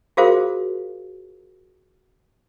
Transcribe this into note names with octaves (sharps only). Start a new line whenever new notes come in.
F4 F#4 G#4 A#4 C5 F5